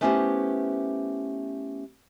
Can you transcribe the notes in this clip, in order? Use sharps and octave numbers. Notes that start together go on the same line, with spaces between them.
A3 B3 C#4 E4 G4 C5